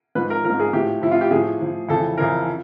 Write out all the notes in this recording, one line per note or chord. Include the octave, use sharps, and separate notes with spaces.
G#2 F3 B4
A#4
F3 A#4
G#2
G#4
A2 F3 G4
A2 F3 E4 F4
G4
A2 F3 G#4
A2 F3
F2 C#3 E3 A4
F2 C#3 E3 A#4
F3